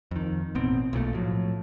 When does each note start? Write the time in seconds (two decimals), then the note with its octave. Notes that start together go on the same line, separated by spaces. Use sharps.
0.11 F2 D#3
0.55 A1 B2 C4
0.93 B1 A#2 D3 A3
1.14 A2 F3 F#3